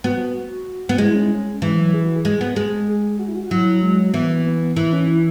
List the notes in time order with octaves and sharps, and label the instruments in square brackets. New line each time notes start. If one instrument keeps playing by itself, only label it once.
[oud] B3 [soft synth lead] F#4
[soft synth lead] F#4
[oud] B3
[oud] G#3 [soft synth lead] E4
[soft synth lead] C#4
E4
C#4
[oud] E3 [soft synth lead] G#3
[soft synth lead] F#3
G#4
F#4
G#4
[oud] G#3
B3
G#3
[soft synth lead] G#4
F#4
E4
F#4
F#4
[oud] F#3 [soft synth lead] E4
[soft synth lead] G#3
[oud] E3 [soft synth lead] B3
[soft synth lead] B3
[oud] E3 [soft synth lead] E4
[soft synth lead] C#4
E4